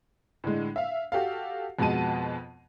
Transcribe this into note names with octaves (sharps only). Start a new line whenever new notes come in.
A2 D3 G#3
E5 F5
F#4 G4 A4 F5
F2 B2 G#3 B3 A5 D#7